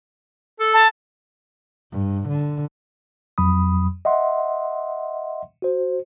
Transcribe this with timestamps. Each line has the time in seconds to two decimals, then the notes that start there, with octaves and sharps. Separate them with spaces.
0.60 A4
0.74 A5
1.92 G2
2.28 D3
3.38 F2 F#3 B5 D#6
4.05 D#5 E5 F#5 C6
5.62 F#4 C5